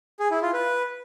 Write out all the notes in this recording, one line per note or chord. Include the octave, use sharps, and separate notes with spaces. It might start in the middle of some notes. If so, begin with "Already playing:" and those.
G#4
E4
F4
B4